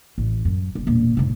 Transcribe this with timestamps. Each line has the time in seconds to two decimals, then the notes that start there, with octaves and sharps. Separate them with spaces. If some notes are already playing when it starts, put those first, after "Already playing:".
0.18 A1
0.45 F#2
0.75 G1
0.87 E1 A#2
1.17 F1 A2